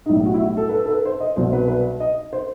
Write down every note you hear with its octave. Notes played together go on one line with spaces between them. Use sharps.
D#4
B1 A2 G3 E4
F#4
E4
F#4
A4
B4
A4
A4
B4
C5
D#5
C2 B2 F#3 C5
B4
B4
D#5
C5